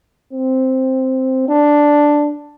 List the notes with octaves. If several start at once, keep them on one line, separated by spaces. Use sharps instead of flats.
C4
D4